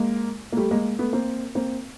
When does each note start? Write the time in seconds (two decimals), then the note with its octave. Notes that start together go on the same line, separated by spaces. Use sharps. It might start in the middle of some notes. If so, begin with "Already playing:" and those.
Already playing: G#3 A#3
0.52 A#3
0.57 G3 A3
0.71 G#3 A#3
0.99 A3 B3
1.13 A#3 C4
1.55 A#3 C4